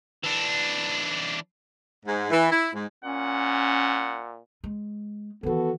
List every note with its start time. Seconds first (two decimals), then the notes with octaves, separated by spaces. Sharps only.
0.24 E3 D4
2.06 G#2
2.31 E3
2.52 E4
2.74 G#2
3.04 A#2 C#4 F#5
4.64 G#3
5.43 D#3 E3 B3 F#4 A4